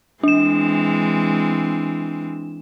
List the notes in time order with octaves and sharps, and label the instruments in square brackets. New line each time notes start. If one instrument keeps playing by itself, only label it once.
[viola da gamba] E3 G#3 C4 [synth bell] D4 E7